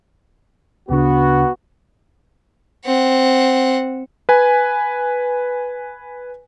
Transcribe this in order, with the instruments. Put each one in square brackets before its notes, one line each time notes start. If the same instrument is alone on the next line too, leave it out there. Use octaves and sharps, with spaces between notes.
[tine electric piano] D2 C#3 D4 [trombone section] B3 F#4
[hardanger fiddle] C4 F#5
[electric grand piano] B4 G#5